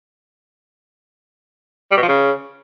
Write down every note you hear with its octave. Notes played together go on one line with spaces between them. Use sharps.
G3
B2
F3
C#3